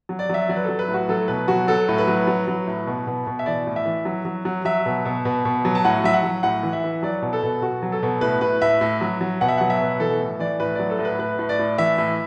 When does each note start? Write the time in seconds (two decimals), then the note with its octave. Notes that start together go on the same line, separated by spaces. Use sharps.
0.09 F#3
0.19 D5
0.29 F#3 E5
0.49 F#3 D5
0.56 B4
0.64 F#3 A4
0.79 B4
0.88 A2
0.94 F#4
1.09 F#3 A4
1.28 B2 B4
1.48 F#3 F#4
1.68 F#3 A4
1.89 A2
1.98 B4
2.08 F#3
2.27 F#3
2.48 F#3
2.67 A2
2.87 B2
3.07 B2
3.27 B2
3.39 E5
3.46 E3 D5
3.67 A2
3.76 E5
3.85 E3
4.05 F#3
4.25 F#3
4.45 F#3
4.65 F#3 E5
4.86 B2
5.05 B2
5.25 B2
5.45 B2
5.65 F#3
5.75 A5
5.85 A2 F#5
6.04 F#3 E5
6.14 F#5
6.23 F#3
6.43 A2 F#5
6.63 E3
6.73 E5
6.84 E3
7.03 F#3 D5
7.22 B2
7.33 A4
7.43 B2
7.62 B2 F#4
7.83 F#3
7.92 A4
8.03 B2
8.21 A2 B4
8.41 A2 B4
8.62 A2 E5
8.81 A2
9.01 F#3
9.21 F#3
9.41 B2 F#5
9.48 E5
9.57 F#3 F#5
9.70 E5
9.81 B2
10.00 E3 A4
10.20 A2
10.39 E3 D5
10.60 A2 B4
10.75 F#3 D5
10.90 A4
10.99 A2
11.05 B4
11.19 A2 B4
11.39 A2
11.49 D5
11.59 A2
11.78 E3 E5
11.98 A2